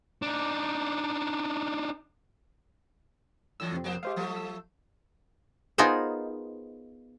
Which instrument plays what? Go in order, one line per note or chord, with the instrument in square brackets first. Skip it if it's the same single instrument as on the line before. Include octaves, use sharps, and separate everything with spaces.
[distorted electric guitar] D4 D#4
[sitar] A2 D3 E3 [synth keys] E6 A#6
[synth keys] F2 C3 C4
[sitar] F3 A#3 C5
[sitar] G#3 [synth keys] G4 C5 F5
[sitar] F3 F#3 A3
[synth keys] E6
[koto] B3 D#4 F4 G#4 A#4 C5